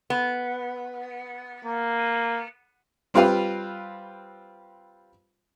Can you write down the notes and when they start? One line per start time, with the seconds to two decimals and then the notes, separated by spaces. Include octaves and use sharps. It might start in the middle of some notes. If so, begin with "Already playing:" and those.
0.10 B3
1.65 A#3
3.14 G3 C4 F4 G4 B4 F5